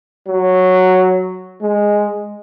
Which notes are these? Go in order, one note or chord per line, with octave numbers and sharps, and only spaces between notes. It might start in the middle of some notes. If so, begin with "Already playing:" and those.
F#3
G#3